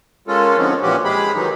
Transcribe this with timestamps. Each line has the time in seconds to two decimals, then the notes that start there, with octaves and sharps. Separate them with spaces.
0.28 G#3 A#3 C#4 F4 A4
0.57 D3 D#3 F3 C4 C#4
0.82 A#2 E3 F3 C#4 F#4 G4
1.05 G#3 G4 G#4 B5
1.35 D#3 E3 F#3 D#4